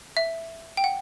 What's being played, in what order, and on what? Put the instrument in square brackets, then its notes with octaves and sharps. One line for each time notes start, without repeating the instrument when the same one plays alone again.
[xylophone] E5
G5
F#5